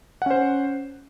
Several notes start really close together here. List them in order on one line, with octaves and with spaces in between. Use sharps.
F#5 C#4 C5